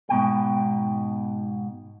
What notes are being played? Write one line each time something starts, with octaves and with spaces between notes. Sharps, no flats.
G#2 B2 G5